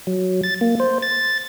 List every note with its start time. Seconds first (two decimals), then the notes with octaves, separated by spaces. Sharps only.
0.07 F#3
0.44 A6
0.61 A#3
0.80 C5
1.02 A6